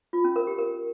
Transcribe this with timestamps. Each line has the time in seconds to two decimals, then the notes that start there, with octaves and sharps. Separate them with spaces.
0.13 F4
0.24 C#4
0.36 A#4
0.47 G4
0.58 A#4